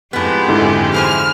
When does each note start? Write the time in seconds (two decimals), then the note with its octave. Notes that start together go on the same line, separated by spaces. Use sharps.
0.13 F2 A2 G#3 B3 G4
0.48 G#2 D3 E4
0.94 E2 C5 G#5 F6